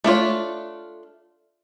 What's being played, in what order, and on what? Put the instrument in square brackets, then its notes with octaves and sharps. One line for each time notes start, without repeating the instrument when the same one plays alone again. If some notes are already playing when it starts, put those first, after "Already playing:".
[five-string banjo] A3 D4 F4 C#5